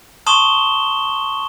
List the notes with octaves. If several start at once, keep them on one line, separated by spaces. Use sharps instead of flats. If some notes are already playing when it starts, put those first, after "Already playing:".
A5 C6 C#6 D#6 E7 G7